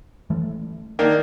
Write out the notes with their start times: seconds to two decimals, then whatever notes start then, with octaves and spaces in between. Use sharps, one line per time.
0.30 E3 A3
0.99 D#3 A#3 D4